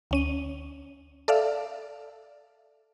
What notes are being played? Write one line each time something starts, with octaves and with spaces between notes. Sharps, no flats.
D2 C#4 D#7
A4 D5 E5 F5